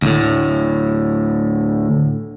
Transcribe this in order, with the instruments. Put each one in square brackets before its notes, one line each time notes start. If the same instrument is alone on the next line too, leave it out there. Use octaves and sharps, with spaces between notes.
[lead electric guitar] D2 A2